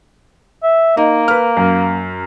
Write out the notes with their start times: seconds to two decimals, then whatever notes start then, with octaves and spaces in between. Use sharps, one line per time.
0.63 E5
0.97 A#3 D#4
1.28 B4 F6
1.57 F#2